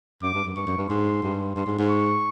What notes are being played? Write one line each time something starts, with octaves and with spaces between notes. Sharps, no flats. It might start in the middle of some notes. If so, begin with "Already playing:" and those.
F#2 D6
G2
F#2
G2 C#6
F#2
G2
G#2 C6
G2
G2 C6
G#2
G#2
C#6